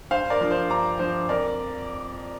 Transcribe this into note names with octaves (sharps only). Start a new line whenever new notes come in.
G2 C5 F5
A#4 D5
F3 D4 A#4
C5
G2 A#5 D6
F3 D4 C5
F2 A#4 D5